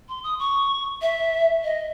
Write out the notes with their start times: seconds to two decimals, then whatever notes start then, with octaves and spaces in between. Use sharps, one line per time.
0.09 C6
0.24 D#6
0.39 C#6
1.02 E5
1.64 D#5